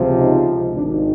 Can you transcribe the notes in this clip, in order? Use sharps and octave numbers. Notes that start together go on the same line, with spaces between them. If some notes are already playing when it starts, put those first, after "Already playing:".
Already playing: C#2 C3 F3
D#4
G#1 G#2 D#3 D4